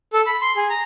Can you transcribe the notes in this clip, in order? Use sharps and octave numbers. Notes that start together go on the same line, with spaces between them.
A4
B5
C6
G#4
A#5